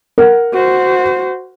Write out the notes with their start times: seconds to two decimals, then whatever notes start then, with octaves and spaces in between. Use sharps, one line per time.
0.18 A#4 F#5
0.53 F#4 C5